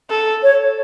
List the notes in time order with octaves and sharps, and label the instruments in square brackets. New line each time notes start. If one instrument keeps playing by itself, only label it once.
[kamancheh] A4
[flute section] C#5